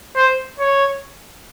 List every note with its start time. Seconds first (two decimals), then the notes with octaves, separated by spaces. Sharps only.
0.16 C5
0.59 C#5